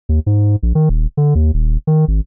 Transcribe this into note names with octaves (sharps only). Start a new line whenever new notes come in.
D#2
G#2
A#1
D#3
D#1
D3
D#2
D#1
D#3
G#1